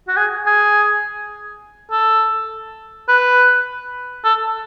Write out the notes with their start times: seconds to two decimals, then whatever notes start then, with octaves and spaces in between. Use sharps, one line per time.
0.08 F#4
0.17 G#4
0.46 G#4
1.92 A4
3.09 B4
4.25 A4